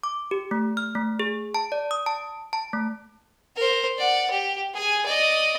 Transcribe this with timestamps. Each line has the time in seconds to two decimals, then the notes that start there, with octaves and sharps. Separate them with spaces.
0.03 D6
0.31 G4
0.51 A3
0.77 F6
0.95 A3
1.19 G#4
1.54 A5
1.72 D5
1.91 D#6
2.06 A5
2.53 A5
2.73 A3
3.56 A#4 C5
3.98 D5 F#5
4.30 G4
4.74 G#4 G#5
5.06 D5 D#5